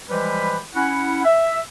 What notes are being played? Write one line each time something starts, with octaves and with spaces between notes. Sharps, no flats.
E3 F3 G3 G#3 G4 B4
C#4 E4 F#5
E5